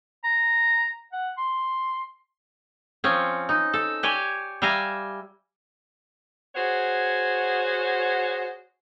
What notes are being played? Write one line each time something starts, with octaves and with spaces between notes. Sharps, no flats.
A#5
F#5
C6
F3 C4 C#4
D#4
A4
G4 C#5 D5 G5 G#5
G3 E5 F5 G#5 A#5
F#4 G#4 C5 C#5 F#5